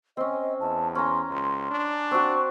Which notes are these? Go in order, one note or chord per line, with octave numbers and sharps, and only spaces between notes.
C4 C#4 D#5
E2 A5
C#4 A#5 C6
C#2 C6
D4
C4 F#4 C#6